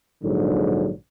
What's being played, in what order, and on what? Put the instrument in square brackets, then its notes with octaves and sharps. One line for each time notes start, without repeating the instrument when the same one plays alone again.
[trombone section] A#1 G#2 D3 F#3